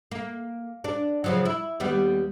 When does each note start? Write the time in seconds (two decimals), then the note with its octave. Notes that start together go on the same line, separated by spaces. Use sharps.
0.11 A#3
0.84 D4
1.24 C#3 F3 F#3
1.45 E4
1.80 D#2 G3 B3